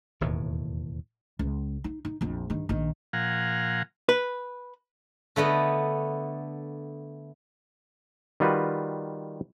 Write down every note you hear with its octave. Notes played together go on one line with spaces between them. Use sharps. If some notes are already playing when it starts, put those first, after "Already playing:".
E1 D#2 A2
C#2
D#4
D#4
A#1 F2
G2 D#3
A#1 D#3
A#2 F3 F5 F#5 G#5 A#5
B4
D3 A3 B3 D#5
D#3 G3 F4 F#4 B4